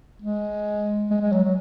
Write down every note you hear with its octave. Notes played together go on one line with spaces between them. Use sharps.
G#3
G#3
G#3
F#3
F#3